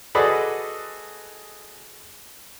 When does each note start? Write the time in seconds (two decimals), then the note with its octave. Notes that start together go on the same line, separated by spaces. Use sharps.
0.15 F#4 G#4 A4 B4 D5 D#5